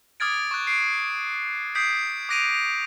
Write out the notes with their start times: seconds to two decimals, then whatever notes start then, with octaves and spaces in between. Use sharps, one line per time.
0.20 D6 D#6 F6 G#6 A6 D7
0.51 C#6 F#6
0.67 C#6 C7 D7
1.75 D#6 G6 B6 C7 D7
2.29 D6 F#6 A#6 D7 D#7 F7